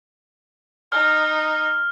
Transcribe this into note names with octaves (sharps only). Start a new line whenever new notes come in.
D#4 F6